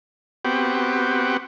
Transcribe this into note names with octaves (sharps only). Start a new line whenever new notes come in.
B3 C4 F#4 G4